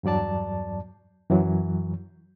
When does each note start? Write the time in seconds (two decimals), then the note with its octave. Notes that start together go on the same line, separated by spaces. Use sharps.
0.03 E2 G2 F#3 D5 A5
1.30 F#2 E3 F#3